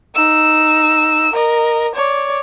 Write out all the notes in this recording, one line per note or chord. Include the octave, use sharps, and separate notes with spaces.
D#4 E6
A#4 D#5
C#5 D5